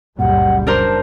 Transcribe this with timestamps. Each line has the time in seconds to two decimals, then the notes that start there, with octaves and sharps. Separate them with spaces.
0.19 F#1 C#2 F#2 A#2 G3 F#5
0.67 D4 A#4 C5 A5